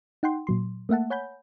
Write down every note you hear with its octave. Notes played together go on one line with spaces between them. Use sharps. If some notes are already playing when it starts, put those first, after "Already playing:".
D#4 F#5 G5 C6
A#2 F#3 C6
A3 A#3 E5 F#5 A5
C#5 F#5 G#5 B5 G6